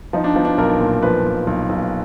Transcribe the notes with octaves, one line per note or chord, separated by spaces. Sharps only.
F3 D#4
D4
F3 B3
D4
B1 A#4
A#2
F3 B4
B1
B1
B1